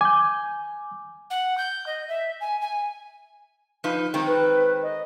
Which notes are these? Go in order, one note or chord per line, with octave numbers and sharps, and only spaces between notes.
G#5 D6 G6
F#5
G6
D#5
E5
G#5
G#5
F3 D#4 B4
D#3 G#3 C4
B4
D#5